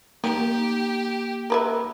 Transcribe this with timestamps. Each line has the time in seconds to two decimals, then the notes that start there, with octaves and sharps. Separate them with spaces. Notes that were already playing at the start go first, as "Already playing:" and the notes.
0.24 D#3 A#3 G4
1.50 A#4 B4 E5